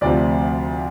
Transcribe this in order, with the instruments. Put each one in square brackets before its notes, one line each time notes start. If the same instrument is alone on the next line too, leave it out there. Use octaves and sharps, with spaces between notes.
[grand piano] D2 C3 F3 D5